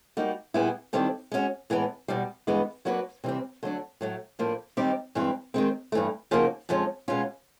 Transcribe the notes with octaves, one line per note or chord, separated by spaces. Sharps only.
G3 A#3 D#4 F#4
A#2 G3 B3 E4 G#4
D#3 G3 C4 E4 A4
G#3 C#4 F#4
A2 E3 G#3 B3
E2 B2 G3
G2 E3 G#3 B3
F#3 A#3 D4 F#4 B4
C3 E3 G3 C4
D3 F#3 A3 D4
A2 F#3 A3
A2 F3 A#3 D4
D#3 G3 C4 D#4 G4
G2 E3 G#3 C4 E4
D#3 G#3 C4
G2 E3 A3
C#3 F3 A#3 D#4 F#4
F2 D3 F3 G#3 C#4
B2 G#3 C#4 F4